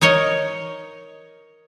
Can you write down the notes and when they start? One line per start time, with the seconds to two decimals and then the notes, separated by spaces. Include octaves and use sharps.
0.01 D#4 A#4 C#5 D#5